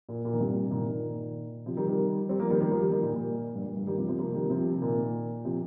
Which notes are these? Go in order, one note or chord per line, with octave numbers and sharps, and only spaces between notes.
A#2
A#2
D#3
G2 C3
A#2 D#3
A#2 D#3
C3 F3
D#3 G3
D#3 G3
G3 C4
F3 A#3
D#3 G3
D#3 G3
F3 A#3
D#3 G3
D#3 G3
A#2 D#3
A#2
G2
G2
G2
D#3 G3
C3 F3
C3 F3
F3 A#3
D#3 G3
C3 F3
A#2 D#3
C3 F3